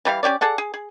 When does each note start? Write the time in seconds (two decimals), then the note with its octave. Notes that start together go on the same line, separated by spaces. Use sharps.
0.05 E3 G3 A#4 F5
0.23 C#4 G4 C#5 D5
0.41 G#4 A4 D5 F#5
0.58 G#4
0.74 G#4